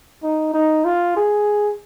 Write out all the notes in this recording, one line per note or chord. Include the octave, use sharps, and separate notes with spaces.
D#4
D#4
F4
G#4